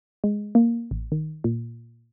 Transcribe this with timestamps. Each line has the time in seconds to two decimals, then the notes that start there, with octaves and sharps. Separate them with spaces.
0.24 G#3
0.55 A#3
0.91 A1
1.12 D#3
1.44 A#2